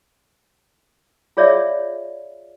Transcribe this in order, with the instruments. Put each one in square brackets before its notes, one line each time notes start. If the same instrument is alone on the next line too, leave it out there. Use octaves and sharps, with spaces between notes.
[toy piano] F4 G#4 C#5 D5 E5 F5